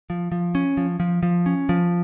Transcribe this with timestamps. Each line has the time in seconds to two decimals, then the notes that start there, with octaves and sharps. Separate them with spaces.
0.10 F3
0.32 F3
0.55 C#4
0.77 F3
1.00 F3
1.23 F3
1.46 C#4
1.69 F3